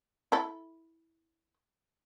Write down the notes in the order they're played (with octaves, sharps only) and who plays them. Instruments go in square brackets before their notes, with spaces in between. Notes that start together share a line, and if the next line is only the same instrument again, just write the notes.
[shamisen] E4 A4